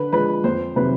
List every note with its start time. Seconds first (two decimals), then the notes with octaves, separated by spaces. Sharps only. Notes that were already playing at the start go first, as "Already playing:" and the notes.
Already playing: D3 B4
0.13 F3 G#3 B4
0.44 F2 C5
0.76 C3 D#3 F#3 B4